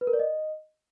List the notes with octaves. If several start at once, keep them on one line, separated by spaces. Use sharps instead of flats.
B4
A#4
D5
D#5